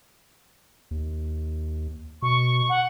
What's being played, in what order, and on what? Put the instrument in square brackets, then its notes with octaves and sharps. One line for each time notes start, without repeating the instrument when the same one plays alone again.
[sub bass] D#2
[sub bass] B2 [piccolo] C#6
[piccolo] F#5